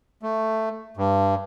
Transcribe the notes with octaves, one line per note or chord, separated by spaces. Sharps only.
A3
G2